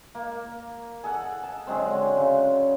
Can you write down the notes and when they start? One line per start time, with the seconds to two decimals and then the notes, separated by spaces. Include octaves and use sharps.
0.15 A#3
1.04 G#4 A4 F#5
1.44 A5
1.67 D3 F#3 G#3 C4
2.16 C#3